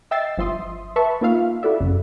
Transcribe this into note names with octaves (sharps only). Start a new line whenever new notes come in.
D#5 E5 G5 E6 A6 C7
G1 F3 E5 C6 D#6
B4 E5 A5 B5 C#6
A#3 D#4 F4 E5 F5
E4 F#4 A4 D5 E5
G1 F#2 C#3